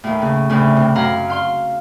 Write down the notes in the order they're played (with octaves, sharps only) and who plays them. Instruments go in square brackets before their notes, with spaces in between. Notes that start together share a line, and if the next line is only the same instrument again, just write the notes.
[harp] D#2 A2
C#3
D2 A2 C#3
C3
F#2 F5 F#5 A#5
F5 C6